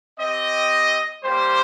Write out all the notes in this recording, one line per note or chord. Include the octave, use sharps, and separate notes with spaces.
C4 G4 D#5
G3 A#3 G4 C5